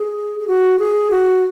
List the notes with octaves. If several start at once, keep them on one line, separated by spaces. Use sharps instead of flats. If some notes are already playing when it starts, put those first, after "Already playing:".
Already playing: G#4
G#4
F#4
G#4
F#4